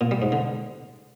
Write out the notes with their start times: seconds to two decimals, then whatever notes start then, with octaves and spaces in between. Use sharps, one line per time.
0.01 A#2
0.11 G3
0.22 G#2
0.32 D3